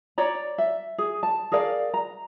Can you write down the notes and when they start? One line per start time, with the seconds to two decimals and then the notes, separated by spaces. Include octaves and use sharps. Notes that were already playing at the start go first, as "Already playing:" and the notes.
0.18 C#5 D5 A#5
0.58 E5
0.98 G#4
1.23 A5
1.52 G#4 A#4 D5 F5
1.94 A#5